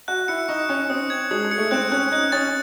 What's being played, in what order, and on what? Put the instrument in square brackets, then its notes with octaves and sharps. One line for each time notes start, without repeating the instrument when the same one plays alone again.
[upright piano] F#4 [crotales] F#6
[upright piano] E4 [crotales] C#7
[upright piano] D#4 [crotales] C#6
[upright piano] C#4 [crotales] C#7
[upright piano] C4 [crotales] D#6
[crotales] G#6
[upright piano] G#3 [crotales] D#6
[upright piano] G#3
[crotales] C#7
[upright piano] A3
[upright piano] C4 [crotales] F#6
[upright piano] C#4 [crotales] F#6
[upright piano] D#4 [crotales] F#6
[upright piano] C#4 [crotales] A6